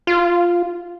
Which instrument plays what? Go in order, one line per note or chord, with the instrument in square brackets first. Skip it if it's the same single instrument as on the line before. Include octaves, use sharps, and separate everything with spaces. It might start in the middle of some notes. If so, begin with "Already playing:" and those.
[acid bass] F4